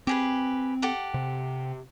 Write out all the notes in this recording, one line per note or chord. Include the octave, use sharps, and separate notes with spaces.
C4 G4 G#4 B4
G4 A4 F#5
C3